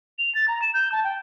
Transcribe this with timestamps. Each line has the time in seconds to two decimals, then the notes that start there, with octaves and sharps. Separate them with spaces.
0.19 F7
0.35 A6
0.48 A#5
0.62 E7
0.74 G6
0.92 A5
1.04 G5